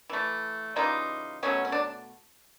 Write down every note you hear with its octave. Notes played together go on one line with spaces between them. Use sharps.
E3 A3
C#3 E3 G3 D#4 F4
B2 F#3 A3 C#4
C#4
D4